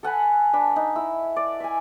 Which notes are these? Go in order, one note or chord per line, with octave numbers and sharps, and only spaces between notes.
A4 F#5 G#5 B5
D4 B5
D#4
E4 E6
D5
E5 G#5